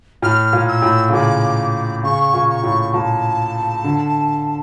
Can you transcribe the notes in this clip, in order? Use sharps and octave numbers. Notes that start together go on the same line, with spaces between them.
A2 F6
A#2
E6
A2
C#3
A#2 D6
C#3 C#6
A#2
C#6
A2
A#2 A5
D3